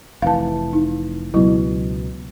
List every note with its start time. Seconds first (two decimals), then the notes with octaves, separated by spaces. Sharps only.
0.22 F1 E3 F5 A5
0.73 D#4
1.34 C#2 B2 F#3 E4